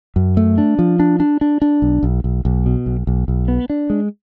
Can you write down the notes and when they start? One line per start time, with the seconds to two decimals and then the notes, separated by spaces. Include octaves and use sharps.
0.16 F#2
0.37 A3
0.58 D4
0.79 F3
1.00 D4
1.20 D4
1.41 D4
1.62 D4
1.82 B1
2.03 B1
2.24 B1
2.45 B1
2.66 B2
2.86 B1
3.07 B1
3.28 B1
3.48 B3
3.70 D4
3.90 G#3